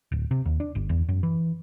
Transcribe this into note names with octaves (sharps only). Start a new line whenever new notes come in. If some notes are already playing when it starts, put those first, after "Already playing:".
D1
C3
D#2
D4
G1
E2
F#2
E3